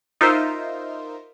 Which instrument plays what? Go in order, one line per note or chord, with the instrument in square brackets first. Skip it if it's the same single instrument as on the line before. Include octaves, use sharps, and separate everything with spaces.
[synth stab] D#4 F4 A#4 C5 E5